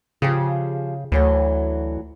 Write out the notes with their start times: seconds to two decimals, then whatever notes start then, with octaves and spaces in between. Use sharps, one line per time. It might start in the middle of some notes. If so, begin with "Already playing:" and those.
0.22 C#3 F3 G4 G#4
1.12 D2 E3 F#3 A3